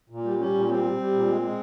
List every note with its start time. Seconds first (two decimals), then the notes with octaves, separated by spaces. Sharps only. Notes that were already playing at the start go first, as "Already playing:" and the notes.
0.10 A#2
0.24 G3
0.39 G3 C#4
0.54 A#2
0.68 G3 C4
0.83 G3
0.98 G3
1.13 A#2
1.28 G#3
1.42 G#3